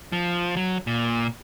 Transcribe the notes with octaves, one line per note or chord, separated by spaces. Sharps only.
F3
F#3
A#2